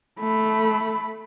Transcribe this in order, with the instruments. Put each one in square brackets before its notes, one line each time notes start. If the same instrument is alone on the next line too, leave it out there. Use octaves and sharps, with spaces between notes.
[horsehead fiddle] A3 B5